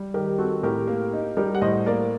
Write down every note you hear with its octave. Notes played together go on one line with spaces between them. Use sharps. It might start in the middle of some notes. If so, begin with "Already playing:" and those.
Already playing: G3
D#3 G4 A#4
C4 F#4 A4
A2 G4 A#4
A#3
D#4
G3 G4 A#4
F#5
A2 C5 D#5
A#3 A#4 D5